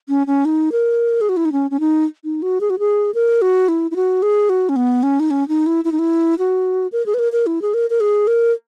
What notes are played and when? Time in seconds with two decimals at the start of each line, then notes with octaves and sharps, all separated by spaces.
0.09 C#4
0.27 C#4
0.45 D#4
0.72 A#4
1.21 G#4
1.29 F#4
1.37 E4
1.45 D#4
1.52 C#4
1.71 C#4
1.80 D#4
2.24 D#4
2.42 F#4
2.61 G#4
2.70 F#4
2.79 G#4
3.14 A#4
3.42 F#4
3.68 E4
3.91 E4
3.96 F#4
4.22 G#4
4.49 F#4
4.69 C#4
4.76 B3
5.03 C#4
5.20 D#4
5.30 C#4
5.48 D#4
5.66 E4
5.84 E4
5.92 D#4
5.99 E4
6.39 F#4
6.92 A#4
7.06 G#4
7.14 B4
7.19 A#4
7.32 A#4
7.46 E4
7.62 G#4
7.74 A#4
7.90 A#4
8.00 G#4
8.27 A#4